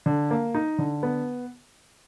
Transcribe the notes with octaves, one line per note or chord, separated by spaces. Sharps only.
D3
A#3
D#4
D3
B3